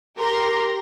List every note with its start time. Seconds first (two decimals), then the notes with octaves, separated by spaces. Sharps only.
0.18 G4 A#4 A#5 C6